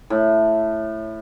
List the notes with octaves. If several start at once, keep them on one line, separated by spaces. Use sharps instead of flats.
A2